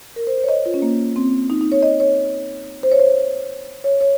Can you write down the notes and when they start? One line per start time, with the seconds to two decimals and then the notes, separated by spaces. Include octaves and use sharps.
0.16 A#4
0.27 C5
0.38 C5
0.44 C#5
0.49 D#5
0.66 F4
0.74 C#4
0.82 A#3
1.16 C4
1.50 D#4
1.61 D#4
1.72 C#5
1.83 D#5
2.00 C#5
2.83 C5
2.92 C#5
3.00 C5
3.84 C#5
4.01 C#5